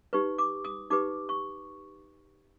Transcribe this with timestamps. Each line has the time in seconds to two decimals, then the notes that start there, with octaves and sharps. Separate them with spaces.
0.13 D#4 G4 B4 C#6
0.38 D6
0.65 D#6
0.90 D#4 G4 B4 D6
1.29 C#6